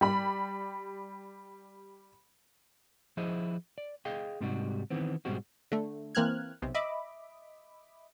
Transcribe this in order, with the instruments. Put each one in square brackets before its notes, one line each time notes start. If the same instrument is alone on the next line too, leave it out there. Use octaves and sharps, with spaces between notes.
[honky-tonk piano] G3 B5
[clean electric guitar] F3 E4 G#4 C5 D#5
D5
G#4 D#5 F5 G5
G#2 C3 G3 D#4 F#4
D#3 E3 B3 C4
G#2 B2 G3 G#3 C4 F#4
[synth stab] D3 A3
E3 A#3 C4 F6 F#6 G#6
B1 C3
D#5 E5 B5 D6